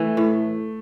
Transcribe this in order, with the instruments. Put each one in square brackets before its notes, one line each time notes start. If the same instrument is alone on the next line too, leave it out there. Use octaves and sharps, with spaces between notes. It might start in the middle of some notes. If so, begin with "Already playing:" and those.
Already playing: [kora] E3 [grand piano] A3
[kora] A2